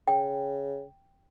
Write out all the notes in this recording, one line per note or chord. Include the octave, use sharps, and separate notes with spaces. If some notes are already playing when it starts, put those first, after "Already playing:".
C#3 G5